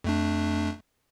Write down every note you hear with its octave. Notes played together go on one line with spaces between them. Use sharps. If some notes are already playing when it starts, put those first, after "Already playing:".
F2 A3 D4